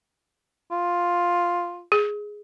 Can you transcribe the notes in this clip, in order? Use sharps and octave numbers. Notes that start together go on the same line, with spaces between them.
F4
G#4